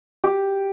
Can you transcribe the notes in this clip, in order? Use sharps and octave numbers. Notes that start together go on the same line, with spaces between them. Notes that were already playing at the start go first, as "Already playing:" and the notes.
G4